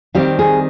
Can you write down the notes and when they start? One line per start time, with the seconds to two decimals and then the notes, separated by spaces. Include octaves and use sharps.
0.15 D#3 G3 C4 G4
0.39 G#4